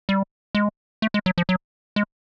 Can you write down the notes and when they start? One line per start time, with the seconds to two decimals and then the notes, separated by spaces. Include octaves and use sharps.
0.09 G3
0.55 G#3
1.02 A3
1.14 G#3
1.26 F#3
1.38 F3
1.49 F#3
1.96 G#3